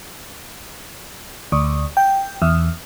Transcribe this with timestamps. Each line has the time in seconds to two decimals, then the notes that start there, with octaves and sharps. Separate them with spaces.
1.52 D2
1.97 G5
2.42 E2